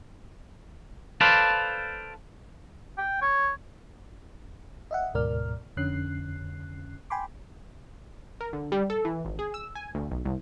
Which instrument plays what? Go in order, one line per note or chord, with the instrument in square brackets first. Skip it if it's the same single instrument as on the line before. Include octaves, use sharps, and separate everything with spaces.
[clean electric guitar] A4 B4 C5 D5 F5 A5
[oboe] G5
C#5
[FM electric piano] D#5 E5 F#5
D2 G#2 B2 A#4 D5 F6
F2 D3 C#4 F#6 C7
G5 G#5 B5 C6 D6
[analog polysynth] A#4
D3
G3
A4
E3
G#1
G#4
E6
G#5
D2
B1
C2